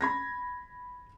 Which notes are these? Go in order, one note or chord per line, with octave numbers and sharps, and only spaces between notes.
B5 G#6 A#6